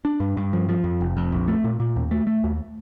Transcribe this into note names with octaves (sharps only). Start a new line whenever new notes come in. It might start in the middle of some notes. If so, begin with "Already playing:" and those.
D4
G2
G2
F3
F3
F2
F1
F2
A#1
A3
A#2
A#2
D#2
A3
A3
D#2